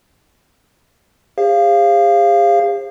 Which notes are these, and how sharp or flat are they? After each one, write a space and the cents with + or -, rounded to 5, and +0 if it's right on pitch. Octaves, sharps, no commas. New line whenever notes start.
G#4 -45 C5 +35 F5 -15